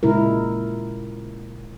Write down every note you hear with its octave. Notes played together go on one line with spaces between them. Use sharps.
A#2 C#3 G#3 E4 A#4